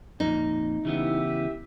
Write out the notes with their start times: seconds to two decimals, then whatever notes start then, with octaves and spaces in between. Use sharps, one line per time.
0.20 F2 A#2 D#4
0.85 C#3 E3 B3 E4 G4 E5